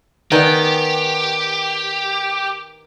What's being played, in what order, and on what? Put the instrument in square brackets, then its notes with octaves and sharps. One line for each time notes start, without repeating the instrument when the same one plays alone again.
[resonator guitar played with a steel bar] D#3 B3 [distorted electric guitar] G4 [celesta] B4 D5 G#5